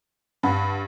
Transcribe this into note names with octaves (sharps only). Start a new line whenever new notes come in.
G2 F5 F#5 B5